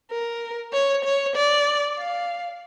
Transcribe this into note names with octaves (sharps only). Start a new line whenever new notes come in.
A#4
C#5
C#5
D5
F5